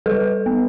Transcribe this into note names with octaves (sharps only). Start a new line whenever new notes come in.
G3 A4 B4
B3